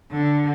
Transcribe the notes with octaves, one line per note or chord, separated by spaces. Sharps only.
D3